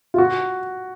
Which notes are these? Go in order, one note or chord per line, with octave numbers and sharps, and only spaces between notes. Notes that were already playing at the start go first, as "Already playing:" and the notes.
F4
F#4